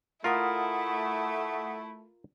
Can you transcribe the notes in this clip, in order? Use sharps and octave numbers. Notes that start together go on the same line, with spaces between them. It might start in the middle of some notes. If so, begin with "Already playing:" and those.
A3 E4 F4 A#4 F#5 D#6